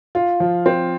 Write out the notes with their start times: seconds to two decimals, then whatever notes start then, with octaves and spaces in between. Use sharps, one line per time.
0.15 F4
0.40 F3
0.66 C4